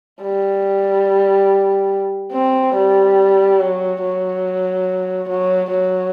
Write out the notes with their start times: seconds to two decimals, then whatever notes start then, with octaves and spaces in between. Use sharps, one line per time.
0.22 G3
2.33 C4
2.75 G3
3.60 F#3
4.02 F#3
5.29 F#3
5.71 F#3